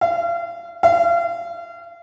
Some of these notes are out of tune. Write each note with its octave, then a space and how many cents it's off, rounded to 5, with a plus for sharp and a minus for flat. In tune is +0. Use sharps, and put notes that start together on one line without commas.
F5 -35
F5 -35